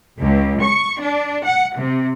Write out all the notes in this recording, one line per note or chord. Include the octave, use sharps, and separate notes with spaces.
C#2
C#6
D4
F#5
C3